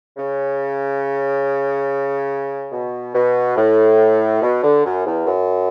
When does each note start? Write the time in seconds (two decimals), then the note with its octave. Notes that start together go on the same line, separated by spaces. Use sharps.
0.17 C#3
2.72 B2
3.14 B2
3.56 A2
4.42 B2
4.63 D3
4.85 F#2
5.06 E2
5.26 F#2